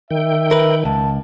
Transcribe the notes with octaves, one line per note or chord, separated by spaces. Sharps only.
D#3 E5 G5
A#4 B4
C#2 A5